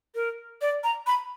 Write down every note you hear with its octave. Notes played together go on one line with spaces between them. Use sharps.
A#4
D5
A#5
B5